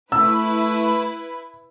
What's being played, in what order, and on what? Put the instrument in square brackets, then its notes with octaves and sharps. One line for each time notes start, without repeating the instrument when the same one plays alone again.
[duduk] A3 [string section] E4 B4 [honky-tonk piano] E6